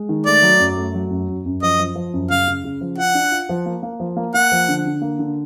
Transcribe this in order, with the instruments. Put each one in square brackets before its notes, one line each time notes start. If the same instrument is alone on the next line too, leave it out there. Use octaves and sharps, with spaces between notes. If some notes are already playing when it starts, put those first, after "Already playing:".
Already playing: [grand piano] G#3
D#3
[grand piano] A3 [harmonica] D5
[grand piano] F#3
F#2
A3
F#3
F#2
F#2
F#2
[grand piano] F3 [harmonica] D#5
[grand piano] F3
F3
F#2
[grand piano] C#3 [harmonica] F5
[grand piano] C#3
C#3
F3
[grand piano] F4 [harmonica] F#5
[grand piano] D4
F4
F3
A#3
A#3
F3
A#3
[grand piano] A#3 [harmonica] F#5
[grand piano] F3
D3
D3
A#3
D3